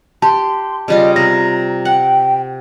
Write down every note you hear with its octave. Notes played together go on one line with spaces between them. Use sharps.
G4 A5 C6
C#3 G3 F4 D#5
C3 A#5 A#6
F#5 G5